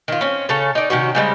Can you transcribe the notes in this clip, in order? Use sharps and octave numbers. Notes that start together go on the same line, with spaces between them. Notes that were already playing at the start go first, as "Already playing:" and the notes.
D#3 F4
C4 C#4
C#3 A4 C#5
D#4 D5
C3 D#3 C#4 F#4
C#3 G3 G#3 C4